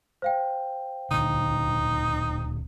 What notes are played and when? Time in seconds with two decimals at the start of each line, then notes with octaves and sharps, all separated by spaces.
0.22 C5 F5 G5
1.11 D1 A#2 D3 D#4